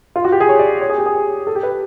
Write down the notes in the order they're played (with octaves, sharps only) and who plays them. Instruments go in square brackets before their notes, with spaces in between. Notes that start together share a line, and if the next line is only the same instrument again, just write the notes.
[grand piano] F4
F#4
G4
G#4
C#5
D5
C#5
G#4
G4
G#4
A4
G4
B4